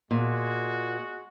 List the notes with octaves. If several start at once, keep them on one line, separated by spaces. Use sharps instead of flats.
A#2 G#3 F#4